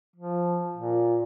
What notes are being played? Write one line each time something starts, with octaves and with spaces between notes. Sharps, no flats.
F3
A#2